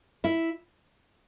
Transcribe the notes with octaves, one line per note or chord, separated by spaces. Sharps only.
E4 E5